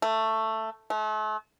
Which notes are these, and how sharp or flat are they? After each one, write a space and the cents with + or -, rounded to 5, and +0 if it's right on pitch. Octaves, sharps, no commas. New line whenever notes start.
A3 +10
A3 -40